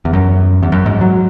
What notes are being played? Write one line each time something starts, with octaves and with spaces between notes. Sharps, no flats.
E2
F#2
E2
F#2
G#2
F#3